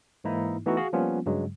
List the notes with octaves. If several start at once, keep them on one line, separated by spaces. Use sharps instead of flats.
G#2 E3 A#3 D#4 E4
E3 A3 B3 D#4 E4 F#4
F#4 G#4 F5
F3 G3 A#3 B3 C#4 F4
G2 C#3 F#3 G#3